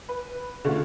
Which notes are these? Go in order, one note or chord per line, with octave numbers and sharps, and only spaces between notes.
B4
D3 A3 C#4 F4 F#4